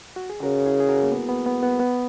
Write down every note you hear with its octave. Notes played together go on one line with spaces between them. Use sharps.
F#4
G#4
C#3 F#4 A#4
E4 G#4
G#4
F#4 A#4
A#3
B3
B3
B3
B3
B3